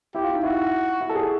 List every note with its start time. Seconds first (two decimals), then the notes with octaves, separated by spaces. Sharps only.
0.15 E4 G4
0.24 F4
0.34 D#4
0.43 E4 F#4
1.01 E4
1.09 A4
1.15 G#4